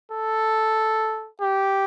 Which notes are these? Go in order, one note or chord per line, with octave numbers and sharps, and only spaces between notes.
A4
G4